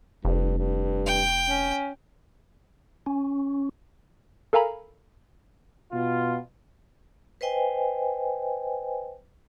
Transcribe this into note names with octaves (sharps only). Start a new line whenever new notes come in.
F1 G2
G2
G5
C#4
C#4
A4 A#4 F5 G#5 A#5 B5
B2 F4
B4 C5 D#5 G5 G#5